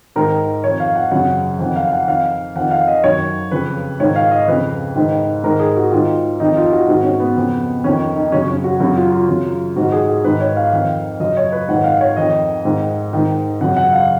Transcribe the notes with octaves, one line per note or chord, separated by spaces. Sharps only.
G#2 D#3 A#4
F2 D#3 C#5
F5
F#5
F#2 C#3 F#5
F2 D#3 F#5
F5
F#5
F2 D#3 F5
F2 D#3 F#5
F5
D#5
F#2 D#3 C#5
F2 C#3 B4
G#2 D#3 C#5
F5
D#5
F2 C#3 B4
G#2 D#3
G#2 D#3 A#4
G#4
F#4
G#2 D#3 F4
F2 D#3 D#4
F4
F#4
G#2 D#3 F#4
C#4
B3
F2 C#3
F2 D#3 C#4
D#4
F#2 C#3 C#4
C#4
F#4
F#2 C#3 F#4
F4
F4
F#2 C#3
G#2 D#3 F#4
G#4
G#4
G#2 D#3 B4
C#5
F5
F2 D#3 F5
F#2 C#3 D#5
C#5
B4
G#2 D#3 F#5
F5
C#5
F2 D#3 D#5
G#2 D#3
G#2 D#3
F#2 C#3 F#5
F#5
F5